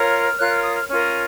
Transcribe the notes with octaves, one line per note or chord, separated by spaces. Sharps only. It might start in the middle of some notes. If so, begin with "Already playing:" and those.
Already playing: F4 A#4 C#5 F6
F4 A#4 C#5 F#6
F6
D#6
F6
C#4 F4 A#4 F6